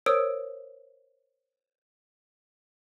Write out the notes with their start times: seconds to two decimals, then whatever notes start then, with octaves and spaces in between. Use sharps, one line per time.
0.06 A#4 C5 C#5 D#6 E6 D7